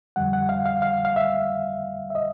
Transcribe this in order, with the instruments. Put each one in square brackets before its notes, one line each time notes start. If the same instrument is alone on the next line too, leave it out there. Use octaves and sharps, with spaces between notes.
[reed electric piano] F2 D3 G3 F#5
F#5
F5
F5
F5
F5
E5
E5
D#5